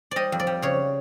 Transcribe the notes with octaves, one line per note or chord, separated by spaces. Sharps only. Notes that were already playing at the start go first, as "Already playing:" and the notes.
G3 D5 D#5
F2
D5
G3
C#3 C#5